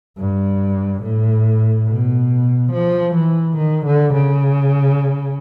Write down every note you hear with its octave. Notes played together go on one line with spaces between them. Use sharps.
G2
A2
B2
F3
E3
D#3
D3
C#3